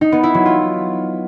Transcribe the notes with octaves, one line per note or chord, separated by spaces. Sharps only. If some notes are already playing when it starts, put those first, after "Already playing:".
D#4
B3
E4
F#3
F4